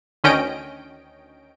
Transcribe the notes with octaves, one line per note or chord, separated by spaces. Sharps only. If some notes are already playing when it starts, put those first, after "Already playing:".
D2 D#3 C#4 D#5 G5 D7